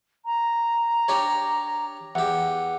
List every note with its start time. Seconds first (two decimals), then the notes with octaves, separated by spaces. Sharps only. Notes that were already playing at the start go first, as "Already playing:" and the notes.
0.26 A#5
1.08 D4 G4 C#5
2.15 E2 G4 F#5